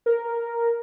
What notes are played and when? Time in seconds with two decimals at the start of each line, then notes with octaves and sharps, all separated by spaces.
0.06 A#4